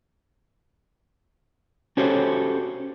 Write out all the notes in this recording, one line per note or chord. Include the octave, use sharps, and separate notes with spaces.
C#4 F#4 G4 A4 C5 C#5